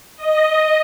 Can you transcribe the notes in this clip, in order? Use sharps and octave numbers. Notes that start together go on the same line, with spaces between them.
D#5